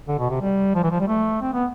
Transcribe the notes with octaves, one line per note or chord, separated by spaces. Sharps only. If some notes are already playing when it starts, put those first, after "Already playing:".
D3
B2
C3
G3
F3
E3
F3
G3
A3
C4
B3